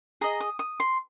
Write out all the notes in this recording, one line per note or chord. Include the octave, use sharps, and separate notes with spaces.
G#4 D#5 A#5
D#6
D#6
C6